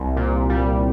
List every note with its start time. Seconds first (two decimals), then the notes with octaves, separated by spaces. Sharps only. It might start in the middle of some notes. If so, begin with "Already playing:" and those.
Already playing: C2
0.16 A#2
0.49 G3